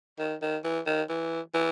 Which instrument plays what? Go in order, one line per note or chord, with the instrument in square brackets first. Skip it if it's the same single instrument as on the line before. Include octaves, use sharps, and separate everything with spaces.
[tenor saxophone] D#3
D#3
E3
D#3
E3
E3